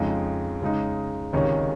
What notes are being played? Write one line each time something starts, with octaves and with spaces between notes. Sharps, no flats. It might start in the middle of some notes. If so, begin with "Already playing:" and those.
Already playing: F2 C#3 G#3 D#4
C#3 G#3 D#4
C#2 C3 D#3 G#3 C#4